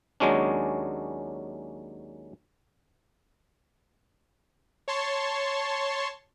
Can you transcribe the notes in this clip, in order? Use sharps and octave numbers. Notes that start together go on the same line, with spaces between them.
D#2 F#3 G#3 C#4 D4
C#5 A5 C6 C#6